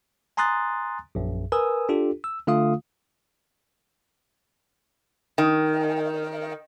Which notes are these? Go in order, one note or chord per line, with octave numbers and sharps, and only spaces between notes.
G#5 A#5 C6 D#6 F#6 A6
A#1 F#2
A#4 B4 G#5 D#6 E6
D4 F4 G4 A4
E6
D3 A3 F4 F5 D#6
D#3